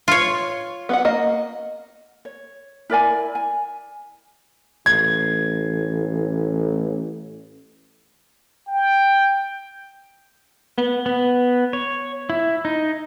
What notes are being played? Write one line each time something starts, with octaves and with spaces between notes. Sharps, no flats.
F4 C#5
B3 F5 F#5
A#3 D#5
C#5
E4 A#4 D5 G#5
G#5
A1 G#6
G5
B3
B3
C#5
E4
D#4